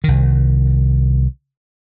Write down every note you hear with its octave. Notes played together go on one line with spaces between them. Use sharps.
C2 D#3